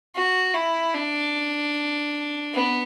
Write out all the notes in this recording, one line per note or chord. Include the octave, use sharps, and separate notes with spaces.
F#4
E4
D4
B3